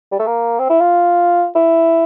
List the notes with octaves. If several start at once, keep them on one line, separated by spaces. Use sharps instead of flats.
G3
A3
A#3
C4
E4
F4
E4